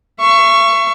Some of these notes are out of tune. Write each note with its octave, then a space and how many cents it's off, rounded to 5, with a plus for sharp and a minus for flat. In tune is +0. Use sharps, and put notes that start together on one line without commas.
E5 +40 C#6 +0